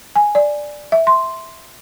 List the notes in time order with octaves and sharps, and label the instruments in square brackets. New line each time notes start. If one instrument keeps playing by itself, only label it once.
[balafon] G#5
D5
E5
C6